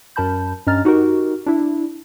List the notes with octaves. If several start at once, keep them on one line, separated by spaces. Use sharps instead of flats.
F#2 A#4 A5 B5 G6
G2 C#4 D#5 A#5 F6 A6
D#4 F#4 G4 A#4
D4 E4